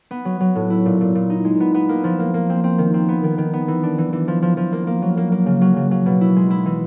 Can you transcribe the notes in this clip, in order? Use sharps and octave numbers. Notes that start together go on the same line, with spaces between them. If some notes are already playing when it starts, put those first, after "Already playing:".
B3
F#3
F#3
A2
E4
A#2
A#2
A#2
D#4
G#3
B3
B3
A#3
F3
A#3
A#3
C4
C4
D#3
C4
B3
D#3
D#3
B3
E3
D4
E3
E3
F3
F3
F3
A#3
A#3
F#3
A#3
A#3
C#3
F#3
C#3
F#3
B2
E4
G#3
E4
E3